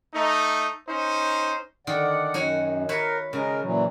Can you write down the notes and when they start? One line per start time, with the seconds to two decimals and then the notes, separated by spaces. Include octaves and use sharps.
0.15 A3 D#4
0.89 C#4 D#4 C5
1.87 D3 D#3 D5 F#5
2.34 F#2 D#4 F#4 C#5
2.89 A#4 B4 C#5 E5
3.33 C#3 G#3 A#4
3.62 A#2 E3 F#3